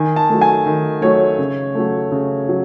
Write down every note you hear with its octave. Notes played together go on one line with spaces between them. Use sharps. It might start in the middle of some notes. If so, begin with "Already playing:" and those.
Already playing: D#3 G#5
A5
F#3 A3
G#5
D#3
F#3 A3 C#5
C#3
F#3 A3
C#3
F#3